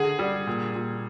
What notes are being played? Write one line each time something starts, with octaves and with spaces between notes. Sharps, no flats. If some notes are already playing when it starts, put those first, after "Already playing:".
Already playing: D3 G#4
G3
A#2
A#2